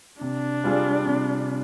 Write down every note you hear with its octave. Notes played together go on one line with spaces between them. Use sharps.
C3 D4
G3 C4 F4 G#4
C3